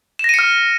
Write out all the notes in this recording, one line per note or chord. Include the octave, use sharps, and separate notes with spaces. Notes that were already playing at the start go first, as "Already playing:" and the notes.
F6 A#6 C#7 D#7 E7